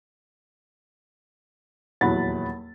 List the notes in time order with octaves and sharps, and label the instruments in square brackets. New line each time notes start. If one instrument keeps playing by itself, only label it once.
[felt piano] D#1 E2 F#3 F#5 B5 A6